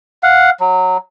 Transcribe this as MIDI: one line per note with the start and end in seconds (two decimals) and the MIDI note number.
0.23 0.50 77
0.23 0.50 78
0.60 0.97 54